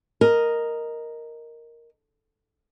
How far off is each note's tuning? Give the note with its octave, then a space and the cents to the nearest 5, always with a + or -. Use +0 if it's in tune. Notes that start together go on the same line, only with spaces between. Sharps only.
A#4 +0 D#5 +0